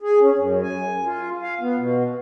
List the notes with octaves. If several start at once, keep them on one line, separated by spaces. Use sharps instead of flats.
G#4
C#4
F#2
G#5
F4
F5
B3
B2